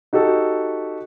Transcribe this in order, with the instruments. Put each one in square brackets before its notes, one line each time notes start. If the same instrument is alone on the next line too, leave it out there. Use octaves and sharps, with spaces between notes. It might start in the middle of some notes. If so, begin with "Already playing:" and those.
[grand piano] D#4 F#4 G4 A4